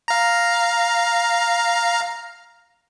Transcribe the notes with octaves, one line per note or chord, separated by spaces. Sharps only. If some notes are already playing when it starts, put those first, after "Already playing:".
F5 A#5